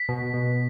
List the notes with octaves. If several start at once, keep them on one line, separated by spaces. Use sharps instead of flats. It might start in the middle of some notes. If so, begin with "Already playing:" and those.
Already playing: B6
B2
B2